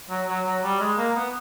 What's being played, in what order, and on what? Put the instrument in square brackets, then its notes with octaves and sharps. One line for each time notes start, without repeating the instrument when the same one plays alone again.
[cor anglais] F#3
F#3
F#3
G3
G#3
A#3
B3